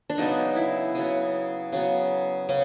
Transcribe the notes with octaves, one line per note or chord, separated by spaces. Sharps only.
D4
C#3 F#3 B3 D#4
E4
C#3 F#3 B3
C#3 F#3 B3
C#3 C#4